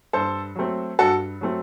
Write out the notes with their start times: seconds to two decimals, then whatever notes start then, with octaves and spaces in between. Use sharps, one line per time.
0.13 G2 A4 C5
0.55 F#3 A3 C4
0.99 G2 F#4 A4
1.41 F#3 A3 C4